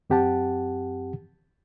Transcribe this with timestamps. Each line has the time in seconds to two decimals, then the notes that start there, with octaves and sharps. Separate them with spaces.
0.10 F#2 C4 G4 F#5 A5